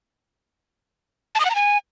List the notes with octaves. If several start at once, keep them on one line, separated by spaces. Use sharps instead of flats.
A5
D#6
F#5
A#5
G#5